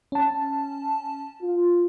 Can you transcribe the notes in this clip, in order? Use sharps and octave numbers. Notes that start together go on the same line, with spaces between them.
C#4 A5
F4